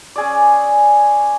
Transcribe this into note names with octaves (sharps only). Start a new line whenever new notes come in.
C#4 G#4 D5